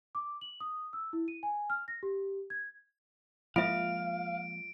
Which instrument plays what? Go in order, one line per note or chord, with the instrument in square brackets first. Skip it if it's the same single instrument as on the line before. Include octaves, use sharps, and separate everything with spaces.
[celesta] D6
F#7
D#6
E6
E4
D#7
G#5
F6
A#6
G4
G#6
[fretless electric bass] F3 G#3 A#3 [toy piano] F4 E5 [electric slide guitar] F5 [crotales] D7